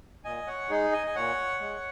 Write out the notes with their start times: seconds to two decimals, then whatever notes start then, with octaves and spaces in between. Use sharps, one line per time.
0.24 A#2 D#5 G#5
0.47 C#5 F#5
0.70 G#3 D#4 G#4
0.92 D#5 G#5
1.07 G#5
1.15 A#2 C#5 F#5
1.61 G#3